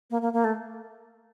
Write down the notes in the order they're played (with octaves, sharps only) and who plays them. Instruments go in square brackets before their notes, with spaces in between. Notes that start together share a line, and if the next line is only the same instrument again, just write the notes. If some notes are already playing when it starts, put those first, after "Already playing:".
[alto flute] A#3
A#3
A#3
A3